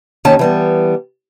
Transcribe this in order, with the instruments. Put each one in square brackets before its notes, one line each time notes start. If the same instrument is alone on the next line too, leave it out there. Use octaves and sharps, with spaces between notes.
[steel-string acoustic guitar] D#2 D#3 C#4 A5
E3 G3 B3